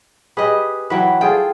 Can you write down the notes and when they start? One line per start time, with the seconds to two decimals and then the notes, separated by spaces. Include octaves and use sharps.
0.37 G4 G#4 B4 D#5
0.90 E3 F#3 B4 G5
1.21 F4 G#4 A4 G5